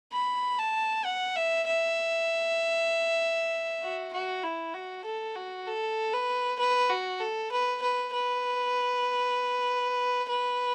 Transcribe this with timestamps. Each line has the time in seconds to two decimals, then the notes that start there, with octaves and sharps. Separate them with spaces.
0.13 B5
0.59 A5
1.05 F#5
1.36 E5
1.66 E5
3.83 F#4
4.13 F#4
4.43 E4
4.74 F#4
5.05 A4
5.36 F#4
5.67 A4
6.14 B4
6.59 B4
6.90 F#4
7.21 A4
7.52 B4
7.82 B4
8.13 B4
10.29 B4